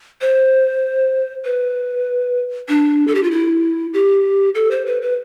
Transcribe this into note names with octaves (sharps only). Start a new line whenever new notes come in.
C5
B4
D4
A4
G4
F4
E4
G4
A4
C5
B4
B4